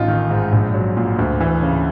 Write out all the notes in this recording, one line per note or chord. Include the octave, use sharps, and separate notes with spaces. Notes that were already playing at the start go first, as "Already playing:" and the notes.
Already playing: A1 D#4 F4
D#3
G#2
A#1
F#3
A#2
D2
E3
C#3